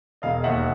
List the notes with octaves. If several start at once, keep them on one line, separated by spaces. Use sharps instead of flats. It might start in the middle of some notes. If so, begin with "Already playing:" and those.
E1 D#5 F5
D#2 E5 F#5